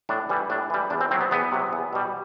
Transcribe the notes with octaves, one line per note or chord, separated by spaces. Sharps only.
A2 D4
E3 G3
A2 D4
E3 G3
E2 D4
C4
C3 F#3 C4
B3
E2 B3
C3 F#3
E2
B2 G3